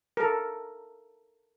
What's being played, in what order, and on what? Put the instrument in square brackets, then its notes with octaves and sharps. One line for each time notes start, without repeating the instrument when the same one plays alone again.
[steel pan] A4 A#4